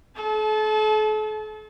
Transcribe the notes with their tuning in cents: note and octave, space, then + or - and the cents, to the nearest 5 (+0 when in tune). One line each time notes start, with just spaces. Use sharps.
A4 -45 A5 -30